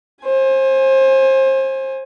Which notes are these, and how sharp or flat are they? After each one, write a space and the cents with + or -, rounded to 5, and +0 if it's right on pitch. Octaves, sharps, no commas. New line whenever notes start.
C5 +30 G#5 +0